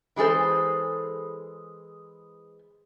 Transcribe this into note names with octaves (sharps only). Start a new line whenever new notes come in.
E3 G#3 G#4 A4 C5